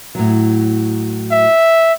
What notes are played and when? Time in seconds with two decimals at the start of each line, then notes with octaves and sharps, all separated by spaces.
0.15 A2 F#3
1.31 E5